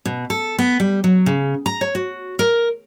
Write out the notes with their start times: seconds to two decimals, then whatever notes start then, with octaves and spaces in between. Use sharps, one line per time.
0.06 B2
0.30 A4
0.59 B3
0.80 G3
1.04 F#3
1.26 C#3
1.66 A#5
1.81 C#5
1.95 F#4
2.39 A#4